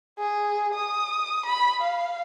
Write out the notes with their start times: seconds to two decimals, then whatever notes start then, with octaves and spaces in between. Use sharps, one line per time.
0.18 G#4
0.74 D#6
1.45 B5
1.81 F5